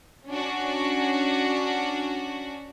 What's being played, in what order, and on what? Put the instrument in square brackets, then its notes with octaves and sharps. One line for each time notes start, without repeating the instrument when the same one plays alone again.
[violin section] C#4 D4 F#4